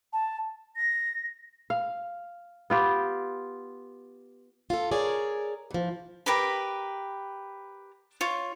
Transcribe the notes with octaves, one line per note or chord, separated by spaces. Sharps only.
A5
A#6
F5
B3 F4 G4
F4 A4
G#4 A#4 C#5 D5
E3 F3
G4 A#4 B4 B5
F4 C#5